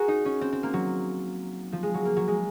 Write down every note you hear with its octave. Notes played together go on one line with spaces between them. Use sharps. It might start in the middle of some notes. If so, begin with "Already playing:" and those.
Already playing: F#4 G#4 A#4
D#4
C#4
C4
C4
A#3
F#3
F3
G#3
F#3
A#3
F#3
G#3